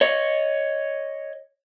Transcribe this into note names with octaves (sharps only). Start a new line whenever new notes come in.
C#5 D#5